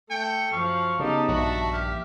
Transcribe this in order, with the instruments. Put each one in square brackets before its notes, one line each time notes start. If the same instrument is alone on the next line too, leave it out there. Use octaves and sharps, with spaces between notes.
[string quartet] A3 [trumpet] G5 [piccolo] C#7
[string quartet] F#2 F3 [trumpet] F5 [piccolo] C#6
[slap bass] C#3 [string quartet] B3 D#4 G4 [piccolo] A5
[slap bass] A#1 G2 [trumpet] F#4 [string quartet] E5
[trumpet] G4 [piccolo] F6